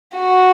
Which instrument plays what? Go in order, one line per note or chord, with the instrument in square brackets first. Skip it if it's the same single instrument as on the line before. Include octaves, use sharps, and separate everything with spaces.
[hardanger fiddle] F#4